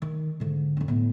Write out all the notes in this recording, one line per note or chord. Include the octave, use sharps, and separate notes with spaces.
D#3
G#2 D3
F2 D4
A2 B3